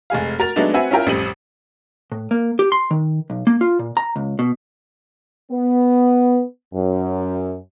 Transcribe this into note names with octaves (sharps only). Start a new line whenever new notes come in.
F1 G#3 G#4 F5
F#4 A#4 A6 F7
F#3 G#3 A3 B3 D4 D#4
C4 F#4 B4 E5 F#5 G#5
C#4 E4 F4 A#4 G5
A1 F2 G3 C4 D#7 F#7
A2
A#3
G4
C6
D#3
B1
A#3
F4
A#2
A#5
C#2
B2
B3
F#2